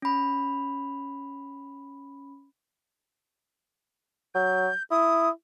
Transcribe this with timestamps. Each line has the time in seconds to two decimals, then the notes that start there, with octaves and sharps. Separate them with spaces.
0.02 C#4 B5
4.35 F#3 G6
4.91 E4 D#6